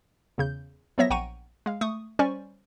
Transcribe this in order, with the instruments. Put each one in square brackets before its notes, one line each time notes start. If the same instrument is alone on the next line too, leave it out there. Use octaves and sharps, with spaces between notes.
[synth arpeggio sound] E2 C#3 G6
F3 F#3 B3 C#5 E5 A#6
A#1 F#5 G5 A#5 C#6 D#7
G#3 F5
A3 C#6 D#6
G3 C#4 C5 D5 G#5 C#6